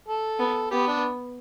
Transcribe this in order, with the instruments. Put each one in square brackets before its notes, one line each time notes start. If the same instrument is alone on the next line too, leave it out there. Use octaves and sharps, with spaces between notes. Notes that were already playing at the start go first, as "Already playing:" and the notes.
[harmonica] A4
[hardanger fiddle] B3
[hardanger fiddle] B3 [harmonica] G4
[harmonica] D4